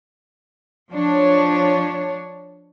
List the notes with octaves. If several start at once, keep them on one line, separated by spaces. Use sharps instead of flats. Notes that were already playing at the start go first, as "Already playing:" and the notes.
F3 D4 C#5